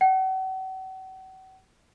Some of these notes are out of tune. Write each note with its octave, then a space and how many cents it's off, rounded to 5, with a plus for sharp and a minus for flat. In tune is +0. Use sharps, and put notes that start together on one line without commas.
F#5 +40